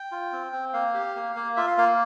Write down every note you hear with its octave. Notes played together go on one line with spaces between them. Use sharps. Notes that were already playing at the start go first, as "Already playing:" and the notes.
Already playing: G5
F4
C4
C4
A#3 F5
G4
A#3
A#3
F4 E5
F5
A#3 F5